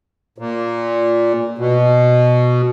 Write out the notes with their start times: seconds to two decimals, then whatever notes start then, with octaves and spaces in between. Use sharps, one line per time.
0.38 A#2
1.58 B2